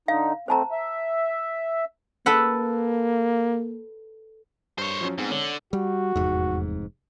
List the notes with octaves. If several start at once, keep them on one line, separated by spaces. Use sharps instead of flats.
D3 D#4 F5
A3 C4 C5 A5 A#5
E5
A#3 A4 B4 F#5
G2 C5 C#5
F3 F#3 C#4
G#2 G#3 B3 C4
D3 C#5
G3 F#4
F1 E2 G#2